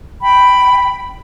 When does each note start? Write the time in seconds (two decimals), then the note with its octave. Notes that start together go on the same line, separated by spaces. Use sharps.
0.21 G5 B5